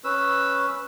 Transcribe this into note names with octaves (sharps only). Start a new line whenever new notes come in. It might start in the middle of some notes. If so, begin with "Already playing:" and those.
C#4 B4 E6